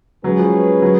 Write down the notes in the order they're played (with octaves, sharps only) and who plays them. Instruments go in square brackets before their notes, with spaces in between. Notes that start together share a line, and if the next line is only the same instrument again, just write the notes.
[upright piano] F#3 [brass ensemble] G#3 C#4 G#4 B4
[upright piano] F3
F#3